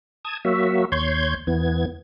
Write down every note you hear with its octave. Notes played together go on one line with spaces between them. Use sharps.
A5 D#6 G#6
F#3 A#3 F#4 E5
D#2 C#5 C6 G6 G#6
E2 E3 B3 G#6